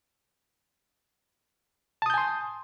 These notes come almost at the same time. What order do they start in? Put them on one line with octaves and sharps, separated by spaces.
A5 D#6 G6 G#5 C6